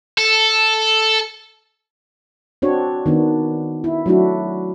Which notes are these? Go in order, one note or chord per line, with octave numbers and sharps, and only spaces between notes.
A4
C4 D4 F#4 C#5
D#3 B3 D4
E4
F#3 A3 D4 E4 F#4